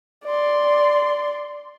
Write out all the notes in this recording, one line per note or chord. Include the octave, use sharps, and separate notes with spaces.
D5 C6